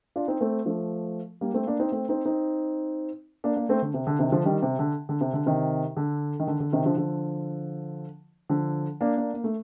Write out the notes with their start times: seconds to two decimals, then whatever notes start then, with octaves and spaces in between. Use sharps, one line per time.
0.16 D4 F4
0.28 C4 D#4
0.41 A3 C4
0.66 F3 A3
1.41 G3 A#3
1.54 A3 C4
1.67 A#3 D4
1.79 C4 D#4
1.92 A3 C4
2.09 C4 D#4
2.26 C4 D#4
3.44 A#3 D4
3.56 A#3 D4
3.69 A3 C4
3.82 D3
3.94 C3
4.07 D3
4.19 C3 D#3
4.32 D3 F3
4.45 D#3 G3
4.62 C3
4.79 D3
5.09 D3
5.21 C3
5.33 D3
5.46 C3 D#3
5.97 D3
6.40 D#3
6.47 D3
6.60 D3
6.72 C3 D#3
6.85 D3 F3
6.97 D3 F3
8.50 D3 F3
9.01 A#3 D4
9.17 A#3 D4
9.34 A#3
9.44 A3